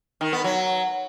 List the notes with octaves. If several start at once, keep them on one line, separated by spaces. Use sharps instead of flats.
D#3
B3
F#3